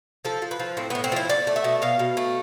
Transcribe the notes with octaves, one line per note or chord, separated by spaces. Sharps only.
F3 A4
F3
B4
F3
A2 C4
B3
A2
C4
F3 E4
A3 D5
A3
E5
B2
B2 F5
B2
A3